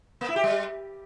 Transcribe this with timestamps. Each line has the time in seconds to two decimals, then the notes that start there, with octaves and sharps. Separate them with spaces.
0.21 A#3
0.28 E4
0.36 G4
0.43 G3